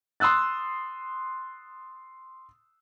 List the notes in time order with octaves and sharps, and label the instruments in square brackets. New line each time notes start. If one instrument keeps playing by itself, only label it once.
[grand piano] C6 D#6 E6 F#6 A6